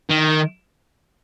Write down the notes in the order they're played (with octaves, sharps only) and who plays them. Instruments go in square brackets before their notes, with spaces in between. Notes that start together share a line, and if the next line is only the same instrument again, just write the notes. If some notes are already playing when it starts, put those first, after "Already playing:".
[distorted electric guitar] D#3